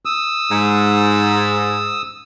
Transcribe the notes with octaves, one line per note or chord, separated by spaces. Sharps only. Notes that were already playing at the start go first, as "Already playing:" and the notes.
D#6 E6
G#2